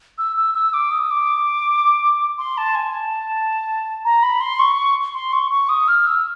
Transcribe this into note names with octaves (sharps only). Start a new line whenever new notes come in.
E6
E6
E6
D6
D#6
D6
C6
A5
G#5
A5
A#5
B5
C6
C#6
C6
C#6
C#6
D#6
F6
E6